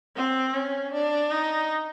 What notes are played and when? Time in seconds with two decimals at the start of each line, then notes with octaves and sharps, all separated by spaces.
0.16 C4
0.55 C#4
0.93 D4
1.31 D#4